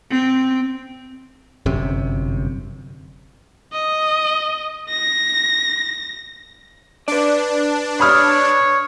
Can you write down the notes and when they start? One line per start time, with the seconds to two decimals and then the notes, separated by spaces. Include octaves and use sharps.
0.10 C4
1.66 G1 F#2 C3
3.73 D#5
4.90 A#6
7.08 D4 B4 D5
8.00 C#5 B5 D#6 F6